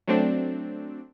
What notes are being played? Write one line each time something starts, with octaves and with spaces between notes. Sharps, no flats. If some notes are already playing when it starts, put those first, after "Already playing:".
F#3 A3 C4 D4